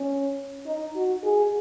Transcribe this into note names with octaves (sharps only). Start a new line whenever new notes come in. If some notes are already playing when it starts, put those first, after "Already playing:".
Already playing: C#4
D#4
F#4
G#4